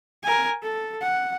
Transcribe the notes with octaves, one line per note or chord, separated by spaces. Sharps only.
A#4 G#5
A4
F#5